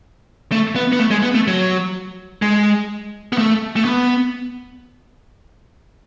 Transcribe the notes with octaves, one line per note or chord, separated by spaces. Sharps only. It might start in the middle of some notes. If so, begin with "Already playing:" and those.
A3
B3
B3
A3
G#3
B3
A3
F#3
G#3
B3
A3
A3
B3